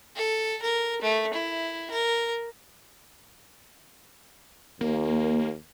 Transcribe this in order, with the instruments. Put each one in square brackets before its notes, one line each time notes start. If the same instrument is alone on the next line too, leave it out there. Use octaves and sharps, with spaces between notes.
[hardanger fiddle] A4
A#4
A3
E4
A#4
[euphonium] D#2 [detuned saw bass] A#3